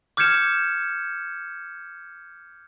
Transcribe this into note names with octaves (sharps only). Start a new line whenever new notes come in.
D6 F6 G6 G#6 C#7 E7